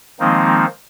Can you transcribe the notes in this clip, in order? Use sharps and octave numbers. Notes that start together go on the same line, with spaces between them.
D#3 F3 G#3 A#3 C4 D#4